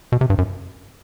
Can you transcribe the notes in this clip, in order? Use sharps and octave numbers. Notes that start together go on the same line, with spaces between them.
B2
C3
G2
F#2